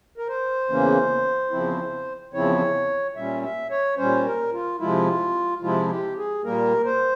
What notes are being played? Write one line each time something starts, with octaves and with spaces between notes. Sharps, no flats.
A#4
C5
E2 C#3 E3 A#3 C#4
E2 C#3 F3 C4 E4
E2 C#3 F3 C4 E4 C#5
A#2 G3 C#4 E5
E5
C#5
A#2 G3 C#4 C5
A#4
F4
C3 F3 G#3 E4 F4
C3 F3 G#3 E4 F4
G4
G#4
A#2 G3 A#3 A#4
C5